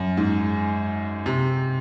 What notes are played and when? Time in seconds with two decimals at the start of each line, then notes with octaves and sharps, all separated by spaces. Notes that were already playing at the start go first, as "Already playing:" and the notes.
Already playing: F#2
0.17 G#2
1.26 C3